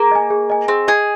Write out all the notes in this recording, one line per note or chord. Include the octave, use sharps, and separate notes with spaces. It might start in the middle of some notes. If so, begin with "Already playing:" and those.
Already playing: A#3 G#4
D#5 G#5
G#4
D#5 G#5
C4 G#4
G#4 D#5 G#5